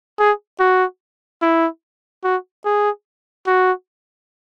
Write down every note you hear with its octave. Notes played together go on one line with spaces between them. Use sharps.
G#4
F#4
E4
F#4
G#4
F#4